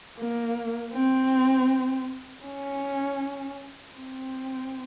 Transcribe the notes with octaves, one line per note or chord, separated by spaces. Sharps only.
A#3
C4
C#4
C4